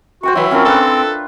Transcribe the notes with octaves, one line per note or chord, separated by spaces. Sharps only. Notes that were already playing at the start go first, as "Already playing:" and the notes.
F#4 C5 G5 C#6
E3 F#3 E4 B5
C4 C#4 F4 A#4
D4 F4 A4 B4